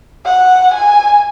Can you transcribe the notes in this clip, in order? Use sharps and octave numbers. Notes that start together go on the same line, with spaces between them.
F#5
G#5